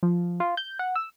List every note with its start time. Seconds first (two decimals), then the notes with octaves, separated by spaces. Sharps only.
0.03 F3
0.40 F4
0.57 G6
0.79 F#5
0.95 E6